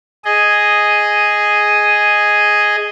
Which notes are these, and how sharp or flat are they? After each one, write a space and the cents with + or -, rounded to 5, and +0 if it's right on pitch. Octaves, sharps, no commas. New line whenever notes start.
G#4 +0 D#5 +0